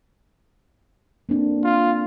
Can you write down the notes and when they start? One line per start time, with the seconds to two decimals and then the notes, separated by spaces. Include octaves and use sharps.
1.29 A#3 C4 D4
1.64 F4